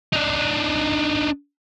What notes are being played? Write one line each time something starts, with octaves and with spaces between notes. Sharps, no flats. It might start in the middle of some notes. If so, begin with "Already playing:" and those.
D4 D#4